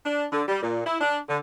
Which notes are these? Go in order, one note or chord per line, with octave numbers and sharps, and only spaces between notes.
D4
D3
G3
A#2
E4
D4
D3